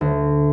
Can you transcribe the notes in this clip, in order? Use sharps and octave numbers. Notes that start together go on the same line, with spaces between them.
D2